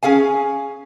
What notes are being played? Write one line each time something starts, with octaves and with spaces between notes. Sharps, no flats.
C#4 G#4 F5 G#5